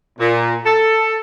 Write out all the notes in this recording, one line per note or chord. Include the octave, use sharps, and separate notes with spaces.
A#2
A4